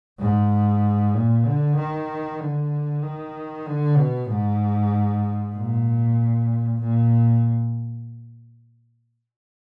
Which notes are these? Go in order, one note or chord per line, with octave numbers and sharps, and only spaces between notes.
G#2
A#2
D3
D#3
D3
D#3
D3
B2
G#2
A#2
A#2